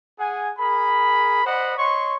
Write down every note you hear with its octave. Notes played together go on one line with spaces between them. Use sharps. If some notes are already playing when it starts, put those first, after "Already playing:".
G#4 F#5 G#5
G#4 A#4 B5
C5 D5 D#5 F#5 B5
C#5 D#5 C6 C#6